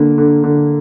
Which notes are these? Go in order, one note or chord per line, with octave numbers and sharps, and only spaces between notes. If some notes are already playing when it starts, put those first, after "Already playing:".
Already playing: D3 A#3
D3
D3